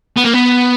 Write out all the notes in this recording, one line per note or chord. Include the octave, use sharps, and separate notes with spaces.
B3
A#3
B3